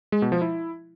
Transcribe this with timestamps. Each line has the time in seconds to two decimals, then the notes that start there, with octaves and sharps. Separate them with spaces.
0.12 G#3
0.22 B2
0.32 F3
0.42 E4